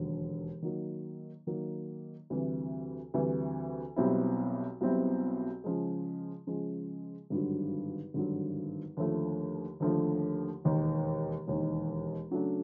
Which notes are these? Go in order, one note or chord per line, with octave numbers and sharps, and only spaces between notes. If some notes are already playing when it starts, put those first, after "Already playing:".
Already playing: E1 D#2 D3 F#3
D#3 F#3 A#3
D#3 F#3 A#3
D2 C3 E3 G3
D2 C3 E3 G3
B1 B2 G3 C4 E4
B1 B2 G3 C4 E4
C#3 F3 G#3
C#3 F3 G#3
G#1 G2 D3 F#3
G#1 G2 D3 F#3
D#2 D3 F3 A3
D#2 D3 F3 A3
E1 D#2 D#3
E1 D#2 D#3
C#3 F#3 A3 D4